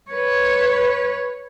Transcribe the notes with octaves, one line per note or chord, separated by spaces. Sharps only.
B4 C#5